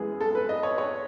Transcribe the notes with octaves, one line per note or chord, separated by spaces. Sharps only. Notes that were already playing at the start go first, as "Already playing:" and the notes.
Already playing: F#2 E3 G#3 B3 G#4
A4
B4
D#5
C#5
C#5